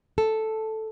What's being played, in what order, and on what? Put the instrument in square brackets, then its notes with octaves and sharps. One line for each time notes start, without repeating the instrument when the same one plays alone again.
[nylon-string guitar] A4